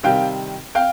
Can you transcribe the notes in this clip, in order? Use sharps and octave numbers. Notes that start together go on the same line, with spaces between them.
C3 D#3 G3 F5 G5
F5 G5